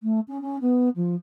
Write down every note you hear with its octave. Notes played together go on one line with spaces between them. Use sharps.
A3
C#4
C#4
B3
F3